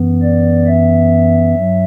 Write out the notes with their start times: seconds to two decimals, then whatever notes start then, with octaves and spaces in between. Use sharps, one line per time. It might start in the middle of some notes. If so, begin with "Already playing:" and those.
Already playing: F#2 E3 B3
0.22 D5
0.67 E5
1.55 G2 F#3